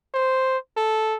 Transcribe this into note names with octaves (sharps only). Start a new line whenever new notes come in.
C5
A4